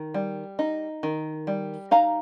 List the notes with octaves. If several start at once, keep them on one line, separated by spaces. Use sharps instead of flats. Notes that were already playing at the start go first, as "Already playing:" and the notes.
Already playing: D#3
G3
D#4
D#3
G3
D#4 F5 A#5